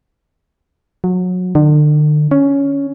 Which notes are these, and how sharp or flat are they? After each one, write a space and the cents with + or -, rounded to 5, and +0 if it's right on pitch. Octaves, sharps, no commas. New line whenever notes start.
F#3 -25
D3 +40
C#4 +10